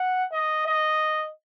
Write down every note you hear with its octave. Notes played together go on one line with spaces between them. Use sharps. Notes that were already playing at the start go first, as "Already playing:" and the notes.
Already playing: F#5
D#5
D#5